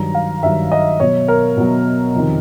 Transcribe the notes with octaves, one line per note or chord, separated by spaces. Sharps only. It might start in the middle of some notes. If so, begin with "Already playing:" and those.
Already playing: G2 D#3 F#3 A#5
F5
G2 D#3 F#3 E5
D#5
B2 F#3 C#5
A#4
B2 F#3
F2 C3 D#3